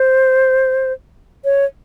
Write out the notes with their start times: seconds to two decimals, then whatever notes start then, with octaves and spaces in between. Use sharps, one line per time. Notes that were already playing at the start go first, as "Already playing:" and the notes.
Already playing: C5
1.45 C#5